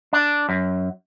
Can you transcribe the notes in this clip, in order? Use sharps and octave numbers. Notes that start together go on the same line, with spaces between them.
D4
F#2